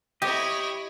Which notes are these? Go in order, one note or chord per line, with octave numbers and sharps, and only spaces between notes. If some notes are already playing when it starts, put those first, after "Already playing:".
E4 G4 C#5 D#5